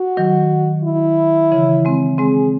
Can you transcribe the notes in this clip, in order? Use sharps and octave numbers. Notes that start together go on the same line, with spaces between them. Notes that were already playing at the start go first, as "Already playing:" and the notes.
Already playing: F#4
D#3 F#3
E4
C#3 E3
G#3 C4
G#3 C4 G#4